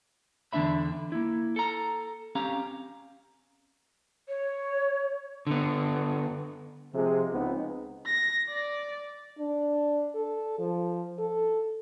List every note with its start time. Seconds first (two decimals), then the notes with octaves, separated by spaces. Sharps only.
0.53 E2 D3 A#3 D4 E5 B5
1.12 A#3 E4
1.56 A4 A#5
2.35 C4 C#4 G4 F5 A#5
4.28 C#5
5.47 D3 B3
6.94 C3 F3 G#3
7.32 C#2 B3 C4 D#4
8.06 A#6
8.49 D5
9.39 D4
10.15 A4
10.58 F3
11.18 A4